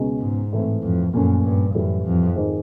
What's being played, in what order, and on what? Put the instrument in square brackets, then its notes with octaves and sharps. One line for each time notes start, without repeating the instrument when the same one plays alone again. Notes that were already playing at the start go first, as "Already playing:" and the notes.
Already playing: [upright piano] C#2 B2 G#3 C#4
[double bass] G#2
[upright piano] A2 E3 A3 C4
[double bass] F2
[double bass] F#2 [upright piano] A#2 F3 A3 C#4
[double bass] G2
[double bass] F#2 [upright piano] A2 E3 G3
[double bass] F2
[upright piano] G#2 D#3 G#3